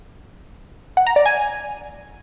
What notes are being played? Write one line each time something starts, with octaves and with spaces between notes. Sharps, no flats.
F#5
A#5
D5
G#5